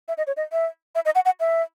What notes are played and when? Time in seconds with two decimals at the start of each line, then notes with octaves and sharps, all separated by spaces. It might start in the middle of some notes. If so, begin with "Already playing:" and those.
0.08 E5
0.18 D#5
0.27 C#5
0.37 D#5
0.52 E5
0.95 E5
1.05 D#5
1.15 F#5
1.25 F#5
1.40 E5